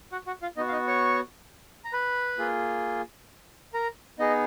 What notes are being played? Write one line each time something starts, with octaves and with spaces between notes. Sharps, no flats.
F#4 F#5
F#4 F#5
F4 F5
B3 D#4 F#4 D#5
F5
D#4 D#5
C#5 C#6
A#5
B4 B5
A#3 F4 G#4
A#4 A#5
B3 D#4 G#4 D#5